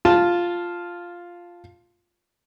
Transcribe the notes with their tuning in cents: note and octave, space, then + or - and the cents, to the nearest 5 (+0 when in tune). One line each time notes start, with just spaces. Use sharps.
F4 +0 A5 +0